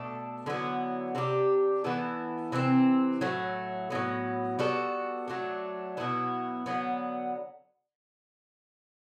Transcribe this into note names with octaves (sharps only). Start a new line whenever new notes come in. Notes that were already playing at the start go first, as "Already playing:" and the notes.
Already playing: B2 A3 D4 A4
D3 F#3 B3 E4
C3 G3 D4 G4
E3 B3 E4 A4
C3 E3 A3 C4
A2 F#3 A3
A2 F#3 B3
G3 B3 F#4 A4
F#3 A3 D4
B2 F#3 B3 E4
D3 F#3 B3